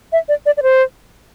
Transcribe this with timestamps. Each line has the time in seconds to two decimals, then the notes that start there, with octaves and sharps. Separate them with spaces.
0.12 E5
0.29 D5
0.46 D5
0.57 D5
0.63 C5